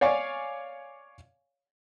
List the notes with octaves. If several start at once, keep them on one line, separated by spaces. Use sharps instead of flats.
C#5 D5 F5 G#5 C#6